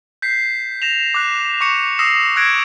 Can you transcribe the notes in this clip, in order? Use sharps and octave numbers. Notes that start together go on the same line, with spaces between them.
G6 B6 C7
A#6 E7 F7
D6 F#6
C#6 D6 C#7
D#6 E6 A#6 C7 E7 F7
D6 E6 F#6 G#6 A#6 D7